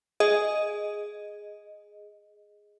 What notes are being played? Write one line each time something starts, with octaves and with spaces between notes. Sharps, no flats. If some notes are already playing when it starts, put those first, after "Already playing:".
G#4 D#5